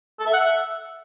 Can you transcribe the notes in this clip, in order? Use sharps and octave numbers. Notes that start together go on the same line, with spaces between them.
A4
E5
F#5
E5